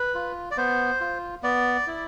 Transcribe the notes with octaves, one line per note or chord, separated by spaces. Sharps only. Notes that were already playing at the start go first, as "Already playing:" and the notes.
Already playing: B4
F4
D5
B3 C5
F4
B3 D5
E4